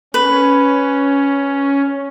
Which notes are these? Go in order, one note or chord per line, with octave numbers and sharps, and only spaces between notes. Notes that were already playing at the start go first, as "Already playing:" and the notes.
C#4 B4